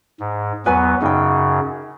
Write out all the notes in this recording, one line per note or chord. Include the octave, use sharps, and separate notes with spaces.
G#2
E2 F#3 B3 B4 G#5
F#2 C#3 D#4 G5